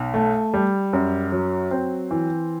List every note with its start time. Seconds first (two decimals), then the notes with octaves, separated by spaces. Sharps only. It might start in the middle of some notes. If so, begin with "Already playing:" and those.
Already playing: B1
0.14 A3
0.54 G3
0.93 F#2
1.32 F#3
1.71 C4
2.11 E3